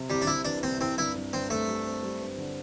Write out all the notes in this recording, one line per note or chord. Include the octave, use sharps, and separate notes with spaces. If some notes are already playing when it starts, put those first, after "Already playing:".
Already playing: C3
C2 G3
D4
C3 E4
E3 D4
C2 C4
C2 C4
G2 E4
G2
G2 C4
A3 C4
G3
C4
G3
G2
D3